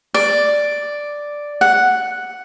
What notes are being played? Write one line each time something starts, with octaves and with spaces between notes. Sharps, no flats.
D5
F#5